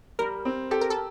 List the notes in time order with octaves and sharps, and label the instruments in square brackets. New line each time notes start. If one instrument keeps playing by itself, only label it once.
[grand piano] G3 [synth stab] A#4
[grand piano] C4
[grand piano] G4 [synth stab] A4
[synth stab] A#4
A4